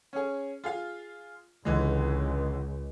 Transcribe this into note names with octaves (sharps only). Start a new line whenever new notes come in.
C#4 G#4
F4 G#4 F5
C#2 D3 E3 G#3